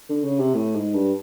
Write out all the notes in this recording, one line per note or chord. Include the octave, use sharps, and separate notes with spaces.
D3
C#3
C3
A2
G#2
G2